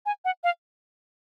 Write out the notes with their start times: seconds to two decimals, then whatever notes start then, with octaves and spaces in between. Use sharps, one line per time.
0.06 G#5
0.25 F#5
0.44 F5